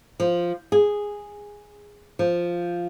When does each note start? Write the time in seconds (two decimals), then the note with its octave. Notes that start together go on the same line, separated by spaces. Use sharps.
0.20 F3
0.72 G#4
2.19 F3